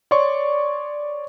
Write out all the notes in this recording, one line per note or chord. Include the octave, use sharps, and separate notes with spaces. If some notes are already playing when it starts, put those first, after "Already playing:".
C#5 D5 C6 C#6